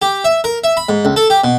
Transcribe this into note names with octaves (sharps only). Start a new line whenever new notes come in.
G4
E5
A#4
E5
B5
G#2
C#2
A4
G4
B2